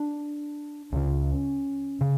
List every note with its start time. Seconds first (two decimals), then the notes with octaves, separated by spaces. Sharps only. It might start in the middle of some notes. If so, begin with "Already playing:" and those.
Already playing: D4
0.92 C#2 C#3 C#4
2.01 C#3